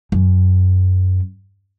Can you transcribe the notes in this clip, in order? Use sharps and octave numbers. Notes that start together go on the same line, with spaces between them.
F#2